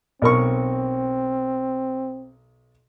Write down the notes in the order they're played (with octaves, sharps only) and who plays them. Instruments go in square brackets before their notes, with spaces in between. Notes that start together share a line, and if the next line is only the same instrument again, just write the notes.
[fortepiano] B1 A#4 C#6 [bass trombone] C4